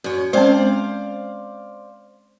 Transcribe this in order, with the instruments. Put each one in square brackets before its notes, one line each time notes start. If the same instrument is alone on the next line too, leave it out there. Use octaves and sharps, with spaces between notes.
[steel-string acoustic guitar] F#2 C#5
[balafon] G#3 C4 C#4 [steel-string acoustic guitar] C5 D5 F5